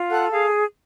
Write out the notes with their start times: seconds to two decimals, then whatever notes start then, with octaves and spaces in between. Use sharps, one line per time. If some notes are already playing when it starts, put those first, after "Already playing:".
Already playing: F4
0.10 A4 F#5 F#6
0.31 G#4 F5